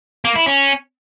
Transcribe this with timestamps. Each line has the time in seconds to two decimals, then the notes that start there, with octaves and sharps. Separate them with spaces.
0.25 A#3
0.36 E4
0.46 C#4